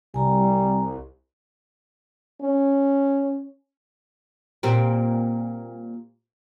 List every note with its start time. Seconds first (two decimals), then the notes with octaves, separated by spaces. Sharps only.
0.14 C2 G3 G#5 A#5
2.42 C#4
4.63 A#2 G3 C4